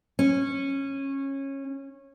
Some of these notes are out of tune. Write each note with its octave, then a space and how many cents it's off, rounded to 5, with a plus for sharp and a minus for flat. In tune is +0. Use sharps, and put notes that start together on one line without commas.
C#4 -20